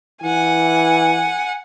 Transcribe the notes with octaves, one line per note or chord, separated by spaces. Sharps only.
E3 F#5 G#5